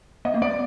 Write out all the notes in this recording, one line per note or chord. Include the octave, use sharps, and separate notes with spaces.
B3 D#5
A#3
B3 D5